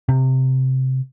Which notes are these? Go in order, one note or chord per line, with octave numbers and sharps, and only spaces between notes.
C3